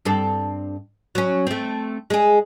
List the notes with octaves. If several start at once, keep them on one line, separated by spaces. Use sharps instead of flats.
G2 C4 A4
F#3 C#4
A3 C4
G#3 G#4